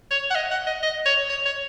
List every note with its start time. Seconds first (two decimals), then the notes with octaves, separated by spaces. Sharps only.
0.11 C#5
0.31 F#5
0.35 D#5
0.51 F#5
0.67 D#5
0.83 D#5
1.06 C#5
1.30 C#5
1.46 C#5